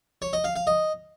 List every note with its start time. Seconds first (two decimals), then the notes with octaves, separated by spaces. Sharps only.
0.22 C#5
0.33 D#5
0.44 F5
0.56 F5
0.67 D#5